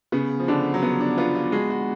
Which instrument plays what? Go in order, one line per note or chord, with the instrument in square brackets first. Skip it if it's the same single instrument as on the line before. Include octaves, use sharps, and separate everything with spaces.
[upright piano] C#3 [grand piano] B3
[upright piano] F3
[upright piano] D3 [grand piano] D4
[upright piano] F#3
[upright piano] F3 [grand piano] B3
[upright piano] D4
[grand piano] B3 [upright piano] F4
[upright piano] F4
[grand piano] G#3 [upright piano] F#4
[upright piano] F#4